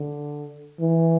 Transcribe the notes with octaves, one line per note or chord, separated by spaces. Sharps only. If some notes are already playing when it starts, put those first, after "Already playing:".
Already playing: D3
E3